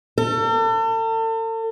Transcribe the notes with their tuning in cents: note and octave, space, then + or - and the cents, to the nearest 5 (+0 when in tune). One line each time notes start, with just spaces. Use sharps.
A4 +40